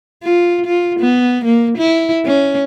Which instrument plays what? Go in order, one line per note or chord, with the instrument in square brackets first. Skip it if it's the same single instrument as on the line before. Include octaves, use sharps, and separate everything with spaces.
[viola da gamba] F4
F4
B3
A#3
E4
C#4